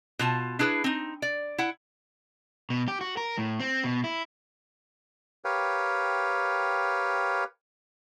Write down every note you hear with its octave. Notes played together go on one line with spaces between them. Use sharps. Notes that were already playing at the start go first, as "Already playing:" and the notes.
B2 F4 A5
D4 E4 G#4 B4
C4 D#4
D5
E4 F#5
B2
G4
F#4
A#4
A2
C4
B2
E4
G4 A#4 B4 C#5 F5 G5